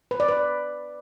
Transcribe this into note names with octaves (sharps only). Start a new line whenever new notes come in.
B4
D5
B4